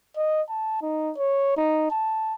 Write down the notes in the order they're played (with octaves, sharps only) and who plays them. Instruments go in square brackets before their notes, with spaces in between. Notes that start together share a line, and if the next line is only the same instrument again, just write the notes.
[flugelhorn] D#5
A5
D#4
C#5
D#4
A5